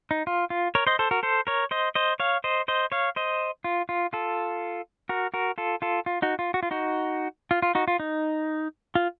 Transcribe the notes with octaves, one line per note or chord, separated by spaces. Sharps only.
D#4
F4
F4
A#4 C#5
C5 D#5
A4 C5
F#4 A#4
A4 C5
A#4 C#5
C5 D#5
C5 D#5
C#5 F5
C5 D#5
C5 D#5
C#5 F5
C5 D#5
F4
F4
F4 A4
F#4 A#4
F#4 A#4
F4 A4
F4 A4
F4
D#4 F#4
F4
F#4
F4
D#4 F#4
F4
F4
D#4 F#4
F4
D#4
F4